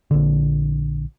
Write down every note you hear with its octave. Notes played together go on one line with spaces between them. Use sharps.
A#1 D3